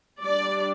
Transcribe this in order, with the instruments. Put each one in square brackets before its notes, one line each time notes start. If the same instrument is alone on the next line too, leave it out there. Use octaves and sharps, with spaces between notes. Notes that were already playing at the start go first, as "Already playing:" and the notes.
[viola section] G3 D4 D5